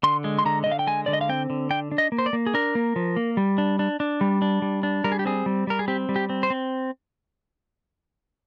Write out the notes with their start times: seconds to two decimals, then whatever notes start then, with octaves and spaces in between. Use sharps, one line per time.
0.03 D3 C6
0.24 G#3
0.39 C6
0.46 D3 A#5
0.64 D3 D#5
0.72 F5
0.79 G5
0.87 G#3 G#5
1.06 D3 D5
1.13 D#5
1.21 F5
1.29 C4 G5
1.50 D3
1.70 D4 G5
1.92 D4
1.98 D#5
2.12 A#3
2.18 C5
2.26 D5
2.33 A#3
2.47 G#4
2.54 D4 A#4
2.75 A#3
2.96 F3
3.16 A#3
3.37 G3
3.58 D4
3.79 D4
4.00 D4
4.21 G3
4.42 D4
4.62 G3
4.83 D4
5.04 G3 A#4
5.12 G#4
5.19 G4
5.25 C4 G#4
5.46 G3
5.67 G3 A#4
5.79 G#4
5.88 C4 G4
6.09 G3
6.16 G4
6.30 C4
6.43 C5
6.50 C4